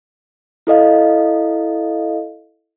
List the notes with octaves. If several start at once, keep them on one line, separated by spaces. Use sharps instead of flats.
E4 A4 D#5 F5